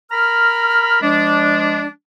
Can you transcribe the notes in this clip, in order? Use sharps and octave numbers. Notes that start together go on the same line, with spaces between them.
A#4 A#5 B5 F6
F3 G#3 D4